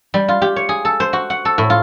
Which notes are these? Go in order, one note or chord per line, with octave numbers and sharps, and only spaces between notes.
G3
F4
G4
C#5
G#4
A4
C5
F#4
F#5
A4
A2
F4